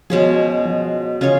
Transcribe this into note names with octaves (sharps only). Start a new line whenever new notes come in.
B2 F3 G#3 C#4 G#4
F3
C#3 C#4 F4 G#4 C#5